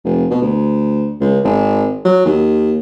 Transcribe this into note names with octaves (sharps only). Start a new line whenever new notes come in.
F1
B2
D2
C#2
G#1
F#3
D#2